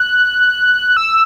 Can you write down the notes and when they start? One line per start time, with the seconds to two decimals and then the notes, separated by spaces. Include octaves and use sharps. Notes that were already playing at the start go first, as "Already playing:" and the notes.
Already playing: F#6
0.97 E6